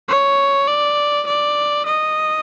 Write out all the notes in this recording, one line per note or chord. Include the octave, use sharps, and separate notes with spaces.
C#5
D5
D5
D#5